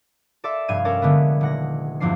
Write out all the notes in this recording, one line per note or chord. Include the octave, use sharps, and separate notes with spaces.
A4 D5 E5 C6
F1 G2 F5 G#6 D#7
C#4 A4 A#4 C#5 D5
D3 G#3 A3 B3
D#1 F#5 A#6
E2 G2 F3 A#3 D4 C7